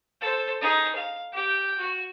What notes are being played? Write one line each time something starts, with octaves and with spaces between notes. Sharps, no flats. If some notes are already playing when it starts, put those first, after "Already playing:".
A4 C5
D#4 G#4
F5
G4 G5
F#4